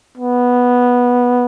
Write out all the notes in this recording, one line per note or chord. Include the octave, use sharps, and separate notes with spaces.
B3